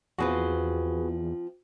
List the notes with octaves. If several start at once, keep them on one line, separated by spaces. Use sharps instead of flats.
E2 F3 C4 F4 F#4 G#4 B4